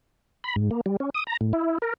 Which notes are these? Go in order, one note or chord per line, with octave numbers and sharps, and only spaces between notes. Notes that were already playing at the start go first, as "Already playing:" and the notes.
B5
G#2
A#3
G3
C#4
D#6
A#5
A2
E4
A#4